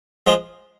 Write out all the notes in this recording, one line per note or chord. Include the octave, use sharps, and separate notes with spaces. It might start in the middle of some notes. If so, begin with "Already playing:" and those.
F3 G#3